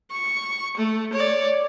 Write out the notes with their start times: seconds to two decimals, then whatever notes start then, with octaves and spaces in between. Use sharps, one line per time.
0.11 C#6
0.76 A3
1.13 C#5 D5